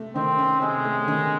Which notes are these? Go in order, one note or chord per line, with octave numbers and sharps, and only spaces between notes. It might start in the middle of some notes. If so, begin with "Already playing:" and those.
Already playing: C3 A3
D#3 C4
C#4
C3 G#3
A3
D#3